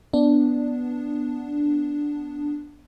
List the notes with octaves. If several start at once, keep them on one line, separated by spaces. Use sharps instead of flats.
B3 D4